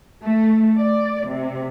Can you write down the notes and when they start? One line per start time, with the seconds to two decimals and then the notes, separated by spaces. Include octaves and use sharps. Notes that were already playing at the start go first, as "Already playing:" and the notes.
0.24 A3
0.78 D5
1.28 C3